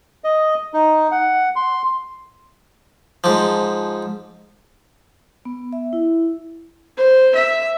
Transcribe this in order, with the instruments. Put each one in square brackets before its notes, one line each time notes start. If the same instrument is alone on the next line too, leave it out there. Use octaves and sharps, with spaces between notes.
[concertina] D#5
D#4
F#5
C6
[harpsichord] G#2 F3
[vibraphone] B3
E5
E4
[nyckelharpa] C5
E5